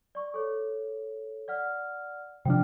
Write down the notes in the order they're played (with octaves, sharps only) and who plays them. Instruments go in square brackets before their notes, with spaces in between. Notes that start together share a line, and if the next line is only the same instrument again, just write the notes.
[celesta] D5 C#6
A4 C#5
D5 F#5 F6
[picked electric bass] C3 F3 D4 [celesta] G5 F6